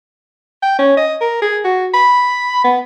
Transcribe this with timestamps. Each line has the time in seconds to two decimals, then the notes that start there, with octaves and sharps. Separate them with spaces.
0.63 G5
0.79 C#4
0.97 D#5
1.21 A#4
1.42 G#4
1.65 F#4
1.94 B5
2.64 B3